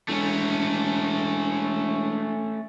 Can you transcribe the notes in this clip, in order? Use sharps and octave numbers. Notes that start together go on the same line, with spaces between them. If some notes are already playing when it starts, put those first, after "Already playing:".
E1 A3 C#4